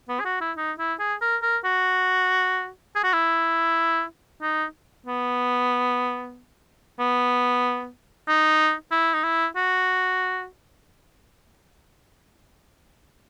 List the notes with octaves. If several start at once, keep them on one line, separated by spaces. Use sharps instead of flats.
B3
G#4
F#4
E4
D#4
E4
G#4
A#4
A#4
F#4
G#4
F#4
E4
D#4
B3
B3
D#4
E4
D#4
E4
F#4